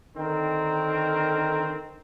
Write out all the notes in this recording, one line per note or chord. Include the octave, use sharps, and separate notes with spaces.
D3 D#3 C4 A#4